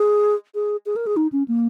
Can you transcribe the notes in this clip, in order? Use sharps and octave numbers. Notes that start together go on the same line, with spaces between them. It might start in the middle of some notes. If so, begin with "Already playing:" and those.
Already playing: G#4
G#4
G#4
A#4
G#4
D#4
C#4
A#3